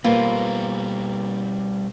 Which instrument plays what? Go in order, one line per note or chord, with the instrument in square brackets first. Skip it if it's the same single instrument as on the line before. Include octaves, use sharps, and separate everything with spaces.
[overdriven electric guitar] B2 G3 [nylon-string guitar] A#3 C4 B4 [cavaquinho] F4